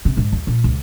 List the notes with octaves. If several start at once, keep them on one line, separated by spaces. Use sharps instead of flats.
C3
G#2
D#2
A#2
C#2